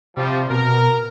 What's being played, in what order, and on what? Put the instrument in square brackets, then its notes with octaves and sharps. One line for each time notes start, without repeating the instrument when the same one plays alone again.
[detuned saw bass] C3 [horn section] F3 G3
[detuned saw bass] B2 [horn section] A#4